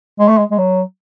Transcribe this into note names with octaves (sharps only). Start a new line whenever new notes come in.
G#3
A3
G#3
G#3
F#3